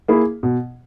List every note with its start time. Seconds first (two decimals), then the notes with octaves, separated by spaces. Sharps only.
0.08 A#3 E4 G#4
0.43 B2